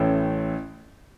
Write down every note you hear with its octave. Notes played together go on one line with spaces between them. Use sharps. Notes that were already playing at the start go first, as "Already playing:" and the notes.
Already playing: A1 A2 A3 C#4 E4